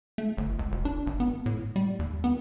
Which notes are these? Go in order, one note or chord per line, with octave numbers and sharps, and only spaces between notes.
A3
G1
C#2
E1
D4
G#1
B3
A2
G3
D#2
B3